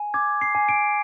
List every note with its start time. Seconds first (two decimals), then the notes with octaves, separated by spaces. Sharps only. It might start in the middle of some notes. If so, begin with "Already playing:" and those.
Already playing: G#5
0.14 D6 G#6
0.41 C7
0.55 G#5
0.69 D7